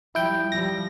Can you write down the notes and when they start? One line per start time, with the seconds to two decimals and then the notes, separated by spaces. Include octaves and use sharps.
0.15 F3 G3 E4 G5
0.52 F3 G3 A#6